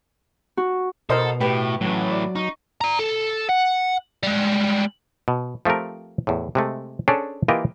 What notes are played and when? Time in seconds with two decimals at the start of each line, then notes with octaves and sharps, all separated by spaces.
0.57 F#4
1.10 B2 A4 A#4 C5 D#5
1.41 A2 G4 B4
1.81 A2 E3 F#3
2.11 D5
2.35 D#4 C#6
2.81 D5 A#5
2.99 A4
3.49 F#5
4.23 G3 G#3
5.28 B2
5.65 F3 A3 C4 G4 A#4
6.27 E2 A2
6.55 C3 G#3 A3
7.08 C#4 D4 G#4 A4 C5 C#5
7.48 E3 A#3 F4 G4 A#4 D#5